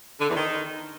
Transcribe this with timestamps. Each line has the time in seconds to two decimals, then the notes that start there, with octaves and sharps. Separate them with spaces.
0.20 D3
0.28 E2
0.36 D#3